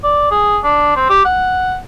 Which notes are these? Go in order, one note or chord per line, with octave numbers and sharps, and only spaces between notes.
D5
G#4
D4
C4
G4
F#5